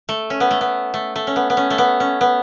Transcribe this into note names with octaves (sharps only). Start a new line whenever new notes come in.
A3
C#4
B3
A3
B3
A3
A3
C#4
B3
B3
C#4
A3
B3
C#4
B3